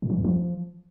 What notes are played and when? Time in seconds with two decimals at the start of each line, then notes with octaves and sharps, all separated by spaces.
0.02 A#2
0.10 E3
0.17 E2
0.24 F3